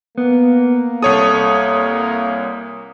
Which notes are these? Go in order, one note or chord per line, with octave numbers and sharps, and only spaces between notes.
A#3 B3
C2 A4 C#5 D#6